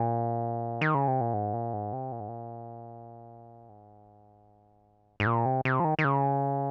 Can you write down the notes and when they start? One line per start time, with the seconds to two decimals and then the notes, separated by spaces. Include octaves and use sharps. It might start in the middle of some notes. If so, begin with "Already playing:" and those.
Already playing: A#2
0.81 D#3
0.95 C#3
1.08 C3
1.21 A#2
1.34 G#2
1.54 A#2
1.73 G#2
1.93 C3
2.12 A#2
2.20 G#2
2.28 A#2
3.69 G#2
5.20 G#2
5.26 A#2
5.46 C3
5.65 C3
5.80 F3
5.85 D#3
5.99 D#3
6.05 C#3